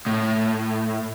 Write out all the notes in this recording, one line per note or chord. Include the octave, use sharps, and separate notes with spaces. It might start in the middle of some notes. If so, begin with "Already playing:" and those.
A2